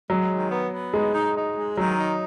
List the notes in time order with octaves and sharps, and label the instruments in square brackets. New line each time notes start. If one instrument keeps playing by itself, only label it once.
[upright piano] F#3 [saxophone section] G#3
[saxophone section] D#3
B3
B3
[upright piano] G#3 [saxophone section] D#4
[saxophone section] D#4
D#4
G#3
[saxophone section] D#3 [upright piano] F#3
[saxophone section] D#4